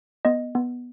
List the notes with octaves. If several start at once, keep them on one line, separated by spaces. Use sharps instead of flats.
B3 D#5
B3